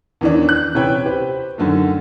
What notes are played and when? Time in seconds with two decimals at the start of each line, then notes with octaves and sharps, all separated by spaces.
0.21 E2 D#3 E3 C#4 D4
0.49 F#6
0.75 C3 C#4 E4 B4 C#5 G5
1.06 G4 B4 C5
1.58 F#2 D3 D#3 A3